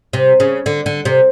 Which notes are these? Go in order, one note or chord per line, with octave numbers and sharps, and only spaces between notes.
C3
C#3
D3
D3
C3